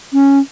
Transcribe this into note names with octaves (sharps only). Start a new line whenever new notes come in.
C#4